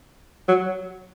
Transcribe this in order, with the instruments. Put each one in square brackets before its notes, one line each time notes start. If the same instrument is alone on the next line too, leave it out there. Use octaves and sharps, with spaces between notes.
[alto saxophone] F#3